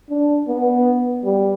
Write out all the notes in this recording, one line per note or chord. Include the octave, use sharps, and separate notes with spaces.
D4
B3
G3